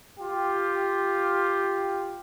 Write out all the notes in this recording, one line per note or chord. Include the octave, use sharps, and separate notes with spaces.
F4 G4